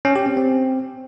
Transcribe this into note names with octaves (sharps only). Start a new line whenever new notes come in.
C#4
G4
C4
C4